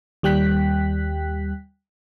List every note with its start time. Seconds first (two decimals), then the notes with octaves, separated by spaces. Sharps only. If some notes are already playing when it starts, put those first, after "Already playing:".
0.23 D#2 G3 G5 F#6 B6